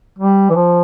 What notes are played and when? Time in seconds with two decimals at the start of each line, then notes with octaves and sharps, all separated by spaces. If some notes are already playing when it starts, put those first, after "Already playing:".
0.19 G3
0.50 E3
0.55 F3